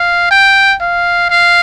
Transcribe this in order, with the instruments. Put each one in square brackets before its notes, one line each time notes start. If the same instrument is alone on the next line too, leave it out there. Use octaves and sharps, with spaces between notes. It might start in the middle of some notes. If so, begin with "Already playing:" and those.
Already playing: [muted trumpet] F5
G5
F5
F5